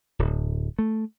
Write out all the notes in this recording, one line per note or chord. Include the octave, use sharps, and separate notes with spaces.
D1
A3